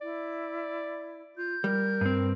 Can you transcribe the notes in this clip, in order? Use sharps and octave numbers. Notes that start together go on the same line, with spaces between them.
E4 D5
F4 G6
G3 A#4
G2 C4